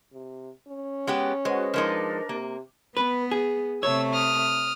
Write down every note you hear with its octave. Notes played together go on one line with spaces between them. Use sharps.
C3
C#4
G#3 B3 G4
G#3 F#4 B4 C5 D#5
F3 G#3 D4 D#4 A#4
C3 A#3
B3 B4
G#4
C3 A3 C#5 E6
D#6 F6